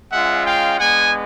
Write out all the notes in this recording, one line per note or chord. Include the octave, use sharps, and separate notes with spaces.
G#3 C#4 F4 E5 F#5
F5 G5
G#3 B3 D4 F#5 G#5